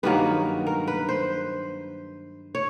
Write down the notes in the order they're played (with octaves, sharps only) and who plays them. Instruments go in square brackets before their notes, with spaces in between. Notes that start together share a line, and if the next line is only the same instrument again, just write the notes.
[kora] G2 D#3 F#3 A#3 B4
A#4
B4
C5
C#5